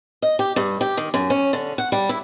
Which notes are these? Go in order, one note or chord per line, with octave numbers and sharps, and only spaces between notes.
D#5
G4
G2
G4
D#3
F#2
C#4
D3
F#5
G3
E4